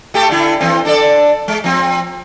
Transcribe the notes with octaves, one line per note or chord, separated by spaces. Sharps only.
A3 G4 A4
D3 E4
E3 C4
D4 A4 D5
G#3
F3 C4